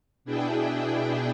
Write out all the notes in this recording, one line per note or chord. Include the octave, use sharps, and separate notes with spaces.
B2 D4 E4 G#4 G5